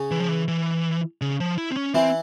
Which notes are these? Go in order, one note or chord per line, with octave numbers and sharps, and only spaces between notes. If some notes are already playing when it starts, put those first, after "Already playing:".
Already playing: C#3 C#4
E3
F3
E3
E3
C#3
F3
E4
C4
C#4
E3 C4 E4